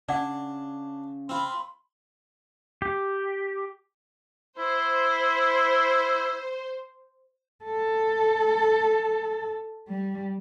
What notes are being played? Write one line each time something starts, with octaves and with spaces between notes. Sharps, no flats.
C#3 D4 D5 F#5
C4 F4 B5 C6
G4
E4 C5
A4
G3